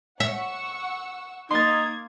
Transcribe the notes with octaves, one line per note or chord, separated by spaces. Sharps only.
E5 F#5 C#6 E6
A#3 D#4 C6 G#6 A6